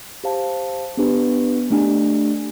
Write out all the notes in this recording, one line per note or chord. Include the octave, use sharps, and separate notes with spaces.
G4 C5 F5 A5
B3 D4 G4 B4
A3 D4 G4